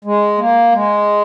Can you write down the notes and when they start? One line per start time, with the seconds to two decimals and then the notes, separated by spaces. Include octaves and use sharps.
0.05 G#3
0.38 A#3
0.72 G#3